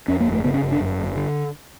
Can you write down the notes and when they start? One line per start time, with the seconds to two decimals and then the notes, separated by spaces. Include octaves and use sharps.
0.08 F2 C#4
0.20 A#3
0.26 G1
0.33 A3
0.44 C#3 B3
0.54 C#4
0.62 G1
0.72 D4
0.80 F#2
0.97 G1
1.16 D3